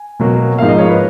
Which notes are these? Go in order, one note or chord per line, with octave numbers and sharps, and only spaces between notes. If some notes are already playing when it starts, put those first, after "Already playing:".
Already playing: G#5
B2 F#3 A#3
G#2 F3 A#3 F5
D#5
C#5
B4